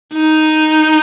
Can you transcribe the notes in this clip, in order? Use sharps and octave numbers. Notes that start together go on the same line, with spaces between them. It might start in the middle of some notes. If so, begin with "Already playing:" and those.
D#4